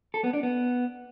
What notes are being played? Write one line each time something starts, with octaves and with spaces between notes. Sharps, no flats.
A4
B3
D4
B3